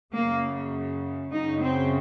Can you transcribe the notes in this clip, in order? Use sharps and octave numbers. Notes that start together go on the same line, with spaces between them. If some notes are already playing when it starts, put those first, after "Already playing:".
F#2 C#3 A#3
F#2 C#3 D#4
C4